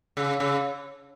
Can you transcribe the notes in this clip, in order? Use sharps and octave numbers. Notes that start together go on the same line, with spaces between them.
C#3
C#3